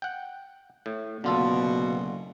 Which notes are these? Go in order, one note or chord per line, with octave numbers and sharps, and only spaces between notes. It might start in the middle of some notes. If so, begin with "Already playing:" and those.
F#5 G5
A2
F#1 B2 D3 F4 A4